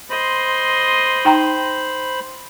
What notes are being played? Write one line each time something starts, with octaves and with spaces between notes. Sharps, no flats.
C5 D#5 B5 C6
D#4 G5 A#5